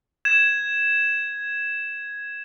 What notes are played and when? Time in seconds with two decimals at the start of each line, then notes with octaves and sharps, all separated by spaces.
0.25 G#6 E7